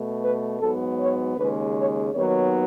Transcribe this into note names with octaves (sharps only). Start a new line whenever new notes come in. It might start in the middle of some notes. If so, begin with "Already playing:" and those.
Already playing: B2 A3
B4
G#2 F#3 B3 A4
C#5
D#2 C#3 G#3 B4
C#5
D#2 D#3 F#3 B3 C#5